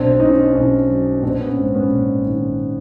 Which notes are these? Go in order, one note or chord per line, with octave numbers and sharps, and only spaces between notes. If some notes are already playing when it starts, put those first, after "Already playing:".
Already playing: B1 C4 D4
B2 C#4 D#4
B1 C#4 D#4
F#3
A#1 C4 D4
B3 C#4
G#2 C4
B3 C#4
A#1
D#3